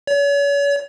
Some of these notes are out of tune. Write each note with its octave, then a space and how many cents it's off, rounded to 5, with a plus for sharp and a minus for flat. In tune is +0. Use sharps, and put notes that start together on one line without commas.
C#5 +40